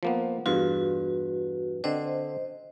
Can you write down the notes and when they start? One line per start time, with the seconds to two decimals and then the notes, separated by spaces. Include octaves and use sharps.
0.03 F3 A#3 B3
0.46 E2 G2 F4 F#4 B4
1.84 D3 C4 D4 C5 D#5